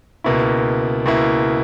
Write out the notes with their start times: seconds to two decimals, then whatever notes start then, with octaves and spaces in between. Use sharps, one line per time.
0.24 C#2 B2 A#3 E4
1.06 C#2 B2 A#3 E4